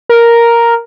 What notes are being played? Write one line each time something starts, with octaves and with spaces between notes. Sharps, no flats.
A#4